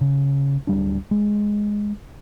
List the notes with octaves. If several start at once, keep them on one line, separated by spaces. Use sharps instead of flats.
C#3
D1 G3 D4
G#3